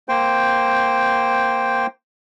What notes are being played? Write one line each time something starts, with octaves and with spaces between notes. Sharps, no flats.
A#3 C5 G5